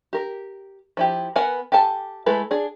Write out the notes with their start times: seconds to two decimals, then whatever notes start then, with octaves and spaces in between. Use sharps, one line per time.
0.13 G4 A#4
0.97 F3 E4 G4
1.36 B3 A#4 B4 F#5 G#5
1.72 G4 A4 G#5 A5
2.26 G#3 A3 E4 A4 B4
2.51 D4 G#4